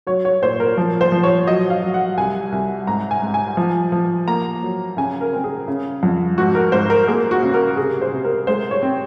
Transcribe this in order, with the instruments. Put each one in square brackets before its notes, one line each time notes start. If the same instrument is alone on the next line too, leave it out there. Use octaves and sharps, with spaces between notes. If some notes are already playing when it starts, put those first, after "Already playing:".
[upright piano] F#3 C#5
C#5
A#2 C5
A#4
F3
C5
F3
C#5
F#3 D#5
F5
F#3
F#5
C2 G#5
C2
G#2 A#5
G#5
G#2
G#5
F3
F3
A#3 A#5
F#3
C#3 G#5
A#4
C4
G#4
C#3
F2
G#2 F#4
A#4
G#2 C5
A#4
A#3 G#4
F#4
C#3
A#4
C3 G#4
C5
C3
A#4
G#3 C5
C#5
C4